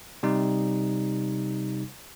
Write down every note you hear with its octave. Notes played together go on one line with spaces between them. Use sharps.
C3 G3 D#4